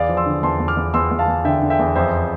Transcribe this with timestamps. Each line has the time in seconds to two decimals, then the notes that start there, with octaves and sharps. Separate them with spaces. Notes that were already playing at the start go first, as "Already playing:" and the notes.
Already playing: E2 D5 F5
0.09 F3
0.17 C6 E6
0.26 D3
0.43 E2 A5 C6
0.60 E2
0.68 D6 F6
0.77 E2
0.94 E2 C6 E6
1.11 E2
1.19 F5 A5
1.28 E2
1.45 D3 E5 G5
1.62 D3
1.70 E5 G5
1.79 E2
1.95 F2 C5 E5